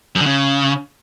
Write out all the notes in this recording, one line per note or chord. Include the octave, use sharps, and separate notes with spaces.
F#2
D3
C#3